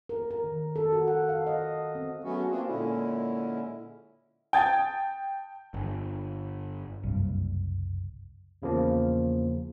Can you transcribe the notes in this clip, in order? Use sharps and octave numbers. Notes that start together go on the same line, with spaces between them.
A#4
A#4
D#3
A4
F#4
F#5
F5
D#5
C4
F#3 G#3 A3 B3 C#4 F#4
A#3 C4 D4 F4 F#4 G#4
A#2 D3 G#3 C#4 E4
G5 A5 D#6 G#6 A6
G1
F#1 C2 G2
E2 C#3 F3 A#3